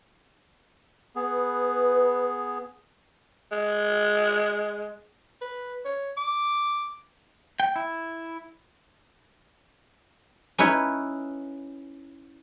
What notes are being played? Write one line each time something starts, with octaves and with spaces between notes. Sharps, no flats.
B3 G#4 B4
G#3
B4
C#5
D6
G5
E4
C#4 D#4 E4 B4 C#5